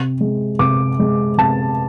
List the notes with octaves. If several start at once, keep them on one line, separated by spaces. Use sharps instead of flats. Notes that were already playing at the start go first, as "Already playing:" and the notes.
Already playing: C3
G#3
C3 D6
G#3
C3 A5